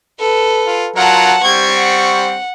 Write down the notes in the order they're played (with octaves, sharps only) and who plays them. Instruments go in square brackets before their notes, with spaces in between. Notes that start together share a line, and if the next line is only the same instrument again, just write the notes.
[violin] A4 B4
[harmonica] F4
[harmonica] F#3 F4 A#4 [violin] F#5 A5
[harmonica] G3 C4 C#6 [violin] G#6
[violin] F#5